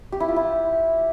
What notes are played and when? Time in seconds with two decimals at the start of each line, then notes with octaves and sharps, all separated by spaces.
0.12 G4
0.20 E4
0.28 F4
0.36 E4